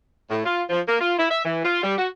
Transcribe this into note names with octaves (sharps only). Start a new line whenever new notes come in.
A2
F4
F3
A#3
F4
E4
E5
E3
F4
G3
F#4